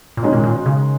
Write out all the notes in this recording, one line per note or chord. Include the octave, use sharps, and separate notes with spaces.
A#2
B2 D#3 G#3 C#4
A#2
A#2
B2
C#3